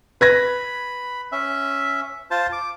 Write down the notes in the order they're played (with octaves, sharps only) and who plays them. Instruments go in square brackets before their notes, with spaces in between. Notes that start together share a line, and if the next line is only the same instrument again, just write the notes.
[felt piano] B4 G#6 A#6 [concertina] B5
[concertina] C#4 E5
F4 C5 A5
D6